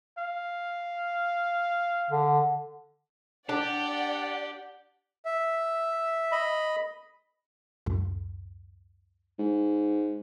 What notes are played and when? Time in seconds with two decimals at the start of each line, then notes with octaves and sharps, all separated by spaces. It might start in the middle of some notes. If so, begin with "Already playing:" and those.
0.18 F5
2.10 D3
3.49 D4 G4 D5 F#5
5.25 E5
6.32 D#5 B5
7.86 C#2 F#2 A2
9.39 G#2